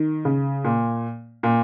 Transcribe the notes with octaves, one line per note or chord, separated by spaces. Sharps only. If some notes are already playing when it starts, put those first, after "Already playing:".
Already playing: D#3
C#3
A#2
A#2